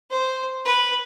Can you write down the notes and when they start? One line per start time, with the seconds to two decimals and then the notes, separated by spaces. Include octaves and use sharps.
0.10 C5
0.65 B4